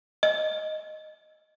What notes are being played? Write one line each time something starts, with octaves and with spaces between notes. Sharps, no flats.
D#5